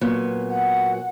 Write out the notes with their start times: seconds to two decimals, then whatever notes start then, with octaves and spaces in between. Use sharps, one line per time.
0.01 A#2 F#3 B3
0.50 F#5